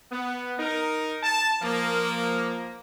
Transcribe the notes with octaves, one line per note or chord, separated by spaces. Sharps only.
B3
D#4 A#4
A5
F3 A#3